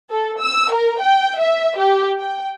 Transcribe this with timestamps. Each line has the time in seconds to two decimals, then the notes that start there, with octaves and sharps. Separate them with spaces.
0.10 A4
0.40 E6
0.72 A#4
1.01 G5
1.40 E5
1.78 G4
2.19 G5